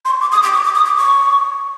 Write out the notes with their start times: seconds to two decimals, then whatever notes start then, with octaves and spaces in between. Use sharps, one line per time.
0.05 C6
0.10 C#6
0.21 D6
0.32 D#6
0.43 D6
0.54 C#6
0.64 D6
0.75 D#6
0.86 D6
0.97 C#6